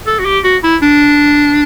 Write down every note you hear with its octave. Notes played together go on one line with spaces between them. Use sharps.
A4
F#4
G4
F#4
E4
D4